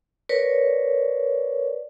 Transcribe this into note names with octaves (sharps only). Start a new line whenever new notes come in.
A#4 B4 C#5 D5